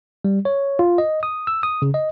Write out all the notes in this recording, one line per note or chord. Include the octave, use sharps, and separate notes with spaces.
G3
C#5
F4
D#5
D#6
E6
D#6
C#3
D#5